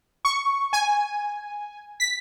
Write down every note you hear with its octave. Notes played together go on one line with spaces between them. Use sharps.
C#6
G#5
B6